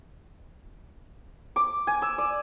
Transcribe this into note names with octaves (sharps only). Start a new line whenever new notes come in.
D6
G#5
E6
D5